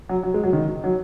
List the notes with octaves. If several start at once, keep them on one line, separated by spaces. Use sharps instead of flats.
F#3
F#3
G#3
F#3
D#3
F#3